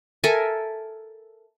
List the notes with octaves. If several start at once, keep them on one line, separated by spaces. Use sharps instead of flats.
A4 A#4 E5 G#5